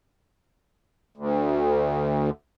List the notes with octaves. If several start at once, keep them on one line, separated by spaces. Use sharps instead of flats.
D2